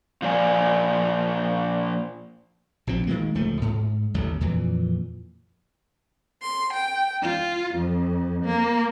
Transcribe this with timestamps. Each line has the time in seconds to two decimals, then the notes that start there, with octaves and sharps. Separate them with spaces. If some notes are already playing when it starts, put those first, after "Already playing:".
0.22 A#2 F3 A#3 B4 D5 G#5
2.87 A#1 B2 F3 C4
3.07 D#3 E3 G#3 A#3
3.35 D1 C#2 F3 A3
3.61 G#2
4.14 A1 D#2 D3 F#3
4.41 F2 A#2 E3
6.41 C6
6.74 G5
7.24 F4
7.76 F2
8.46 A#3